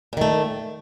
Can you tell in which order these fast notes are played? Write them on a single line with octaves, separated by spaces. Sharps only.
A#2 D#3 A3